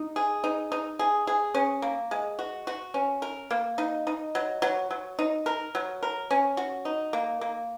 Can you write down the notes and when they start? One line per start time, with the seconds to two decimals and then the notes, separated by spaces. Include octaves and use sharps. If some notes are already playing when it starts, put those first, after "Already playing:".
Already playing: D#4
0.16 G#4
0.44 D#4
0.72 D#4
0.99 G#4
1.27 G#4
1.54 C#4
1.82 A#3
2.11 G#3
2.39 F#4
2.67 F#4
2.94 C#4
3.22 A#4
3.51 A#3
3.78 D#4
4.07 D#4
4.35 F#3
4.62 F#3
4.91 F#3
5.19 D#4
5.46 A#4
5.75 F#3
6.03 A#4
6.31 C#4
6.57 F#4
6.85 D#4
7.13 A#3
7.41 A#3